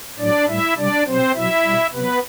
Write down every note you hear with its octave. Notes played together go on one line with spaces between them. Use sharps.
A2 F#3 D4 D5
A2 G3 E4 E5
C3 G3 D4 D5
B2 F#3 C4 C5
B2 F#3 E4 E5
B2 G3
C3 F#3 B3 B4